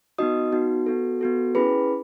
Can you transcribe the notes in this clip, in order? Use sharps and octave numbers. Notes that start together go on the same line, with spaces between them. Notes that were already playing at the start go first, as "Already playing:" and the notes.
B3 D#4 F#4 D#5 D#6
B3 D#4 F#4
B3 F#4 A4
B3 F#4 A4
C#4 E4 G#4 B4 B5